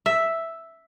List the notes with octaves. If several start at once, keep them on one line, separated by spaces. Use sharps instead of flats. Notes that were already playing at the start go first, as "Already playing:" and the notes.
E5